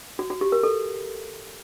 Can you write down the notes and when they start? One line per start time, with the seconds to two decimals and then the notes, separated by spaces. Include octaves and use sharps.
0.19 F#4
0.30 F#4
0.41 G4
0.52 A#4
0.63 A4